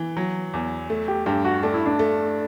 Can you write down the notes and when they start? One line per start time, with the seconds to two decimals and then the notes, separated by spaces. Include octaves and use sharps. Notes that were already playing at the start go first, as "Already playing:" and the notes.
Already playing: E3
0.17 F#3
0.53 E2
0.90 A3
1.08 G4
1.26 G2 G4
1.45 F#4
1.62 A3 D4
1.74 E4
1.85 D4
1.99 A3